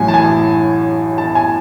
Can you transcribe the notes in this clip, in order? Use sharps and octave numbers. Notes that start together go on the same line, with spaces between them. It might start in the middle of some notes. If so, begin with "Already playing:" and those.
Already playing: A1 A2 F#3 G#5
A5
G#5
A5
G#5